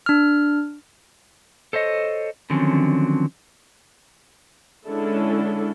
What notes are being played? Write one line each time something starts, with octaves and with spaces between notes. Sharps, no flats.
D4 F6
A4 C5 C#5 D#5
D3 D#3 F3 F#3 C4 C#4
D3 G#3 C#4 D4 E4 A4